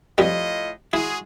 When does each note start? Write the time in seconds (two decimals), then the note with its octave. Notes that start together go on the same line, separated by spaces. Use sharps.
0.18 F2 A2 G3 F4 D#5
0.93 G#3 E4 F#4 G#4